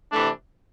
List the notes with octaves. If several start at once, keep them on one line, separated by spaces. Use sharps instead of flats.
C3 E3 A3 D4